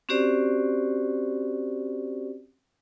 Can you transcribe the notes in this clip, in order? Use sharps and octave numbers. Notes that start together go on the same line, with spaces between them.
C4 C#4 F#4 G4 C5 D5